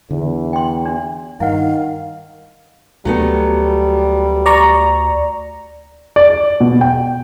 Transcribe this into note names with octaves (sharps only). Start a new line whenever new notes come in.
E2 D3
G5 C6
D4 F#4
G2 D#3 E4 F5 F#5
D2 F#3 G3 A3 B3
D5 A#5 C#6
D5
B2
G5